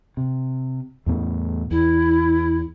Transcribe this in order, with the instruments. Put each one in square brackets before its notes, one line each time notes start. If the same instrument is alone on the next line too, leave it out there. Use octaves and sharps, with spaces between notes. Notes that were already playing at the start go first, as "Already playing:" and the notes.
[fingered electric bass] C3
E2 A2 B3
[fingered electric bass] E2 [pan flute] E4